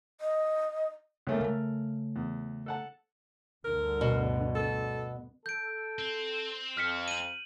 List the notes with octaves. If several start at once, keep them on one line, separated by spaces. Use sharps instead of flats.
D#5
C#2 A3 A#3
C#3 A3 A#4
E2
A4 F#5 A5
D2 G2 D3 A#4
B2
A4
A4 G6 D7
C4
F2 F6 B6 C#7
D#7 F#7